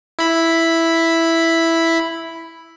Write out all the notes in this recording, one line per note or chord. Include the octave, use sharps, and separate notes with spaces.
E4 B5